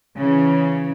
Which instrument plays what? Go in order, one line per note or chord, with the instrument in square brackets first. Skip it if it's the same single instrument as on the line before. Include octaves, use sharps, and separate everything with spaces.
[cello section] C#3 E3